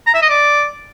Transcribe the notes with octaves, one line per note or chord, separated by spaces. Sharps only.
A#5
E5
D#5
D5